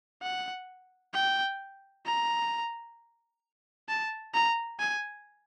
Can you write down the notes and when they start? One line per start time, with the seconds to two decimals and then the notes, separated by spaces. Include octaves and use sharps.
0.23 F#5
1.14 G5
2.06 A#5
3.89 A5
4.34 A#5
4.80 G#5